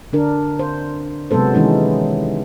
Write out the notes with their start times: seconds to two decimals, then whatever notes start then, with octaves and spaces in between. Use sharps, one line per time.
0.13 D3 D4 A#4
0.59 C5
1.31 C3 F#3 G#3 B3 A4 C5
1.54 D#3 E3 G#3 C#4 D#4